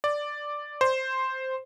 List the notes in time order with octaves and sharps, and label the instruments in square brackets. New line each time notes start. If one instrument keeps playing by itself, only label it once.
[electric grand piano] D5
C5